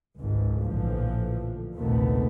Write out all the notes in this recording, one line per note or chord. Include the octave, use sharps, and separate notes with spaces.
G#1 C#2 G#2
A#1 A2 D3 E3 F3
A#1 D#2 A2 C3 A3 B3